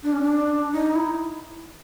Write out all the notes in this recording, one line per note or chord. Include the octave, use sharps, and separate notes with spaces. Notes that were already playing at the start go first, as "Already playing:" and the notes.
D4
C#4
D4
D#4
E4